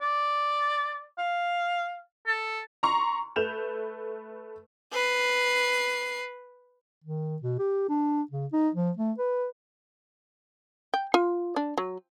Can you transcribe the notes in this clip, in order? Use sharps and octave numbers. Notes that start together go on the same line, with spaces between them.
D5
F5
A4
A#5 C6 C#6
A3 B4 G6 E7 F7
B4 C7
D#3
B2
G4
D4
C#3
D#4
F3
A3
B4
G5
F4
D4
F#3